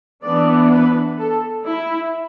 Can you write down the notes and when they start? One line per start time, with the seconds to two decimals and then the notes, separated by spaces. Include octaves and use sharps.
0.23 E3 B3 D4 D5
0.71 B4
1.18 A4
1.66 E4